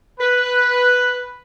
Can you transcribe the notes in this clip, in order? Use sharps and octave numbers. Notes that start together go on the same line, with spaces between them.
B4